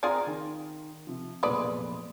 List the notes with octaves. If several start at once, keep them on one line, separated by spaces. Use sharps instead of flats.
C4 F4 G#4 D5 A#5
D#3
C3 F3
F1 B1 A#2 G#3 B4 D5